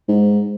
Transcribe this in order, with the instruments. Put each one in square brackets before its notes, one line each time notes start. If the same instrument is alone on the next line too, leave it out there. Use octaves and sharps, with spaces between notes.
[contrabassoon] G#2